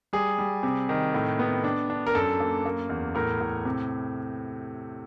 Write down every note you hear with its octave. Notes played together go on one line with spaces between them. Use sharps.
G3 G#4
G3
C3
D#3
A2
B3
D4
D4
A#4
F#2 A4
A#3
A#3
E2
A2 A#4
A2
C3